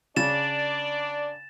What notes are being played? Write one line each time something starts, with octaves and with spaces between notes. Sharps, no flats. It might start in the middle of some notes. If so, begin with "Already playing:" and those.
C#3 D4 D5 A6 E7